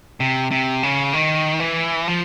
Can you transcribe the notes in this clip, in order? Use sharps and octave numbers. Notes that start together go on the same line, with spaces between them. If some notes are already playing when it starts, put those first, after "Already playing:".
C3
C3
C#3
D#3
E3
F3